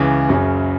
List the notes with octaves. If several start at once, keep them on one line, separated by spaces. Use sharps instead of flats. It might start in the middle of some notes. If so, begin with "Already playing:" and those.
Already playing: C#2 C#3 E3
F#1 F#2 C#3 F#3